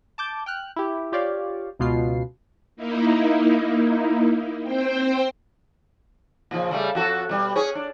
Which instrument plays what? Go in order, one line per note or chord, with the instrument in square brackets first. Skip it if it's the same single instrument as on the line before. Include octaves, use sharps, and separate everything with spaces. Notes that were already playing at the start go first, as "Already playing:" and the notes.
[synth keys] A5 D6 G6
G5 F6 F#6
E4 G4
F4 G4 C#5 D5 F5
C#2 B2 F4 C7
[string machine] A#3 D#4 E4
C4 C5 G5
[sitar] A#2 C#3 F3
C#3 G3 A3
F2 F#4 A4
B2 G3
C#4 G#4 C#5
D4